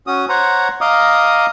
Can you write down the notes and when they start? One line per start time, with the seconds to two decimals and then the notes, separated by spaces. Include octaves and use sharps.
0.07 C#4 F#4 D#6
0.29 C5 C#5 F#5 A#5
0.81 D#5 F5 A#5 D6 D#6